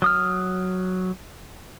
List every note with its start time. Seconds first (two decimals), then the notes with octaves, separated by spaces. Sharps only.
0.02 F#3 D#6 F6